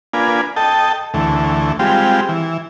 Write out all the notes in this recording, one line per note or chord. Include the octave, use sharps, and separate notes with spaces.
A#3 D4 F4 B4 G#5
A4 D#5 G5 A5
D2 E3 A3
G3 G#3 C4 F4 G4
E3